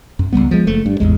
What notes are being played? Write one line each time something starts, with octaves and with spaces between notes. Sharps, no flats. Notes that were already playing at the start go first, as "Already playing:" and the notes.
F#2
C#2 G#2 G3 B3
F3 G#3
F#1 A3
G2
A1 E2 G#3